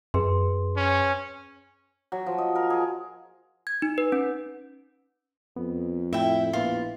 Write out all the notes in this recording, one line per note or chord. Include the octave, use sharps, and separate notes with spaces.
F#2 G#4 B4 C6
C#4
F#3
F3
D#5
A#4
G#4
G#6
D#4
B4
C#4
F2 B3
A2 A3 E4 E5 G5
A#1 A#3 B3 F4 B4